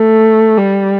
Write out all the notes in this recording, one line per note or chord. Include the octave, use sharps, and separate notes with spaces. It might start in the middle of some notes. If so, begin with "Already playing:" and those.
Already playing: A3
G3